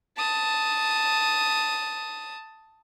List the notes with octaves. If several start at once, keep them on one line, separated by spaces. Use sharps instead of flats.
A5 D#6